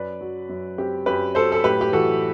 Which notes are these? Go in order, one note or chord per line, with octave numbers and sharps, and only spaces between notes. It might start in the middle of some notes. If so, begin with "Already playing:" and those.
Already playing: F#2 B4 D5
F#3
F#2
C4 G4
F#2 G4 B4
F#3 A4 C5
A4
A2 G4 B4
G4
E3 F#4 A4